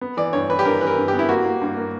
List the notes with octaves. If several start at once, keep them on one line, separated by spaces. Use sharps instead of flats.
B3
E3 D5
G2 C#5
E3 B4
G4
G2 A#4
E3 B4
A#4
G2
G4
B3
E4
A#3 F#4
A#3
G2
A#3